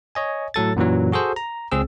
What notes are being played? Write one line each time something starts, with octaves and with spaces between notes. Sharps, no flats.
C#5 D#5 G#5
A2 F#3 A4 A6
F#2 A#2 E3 F#3
F#4 G#4 A4 C5
A#5
C#2 C4 G#4 E6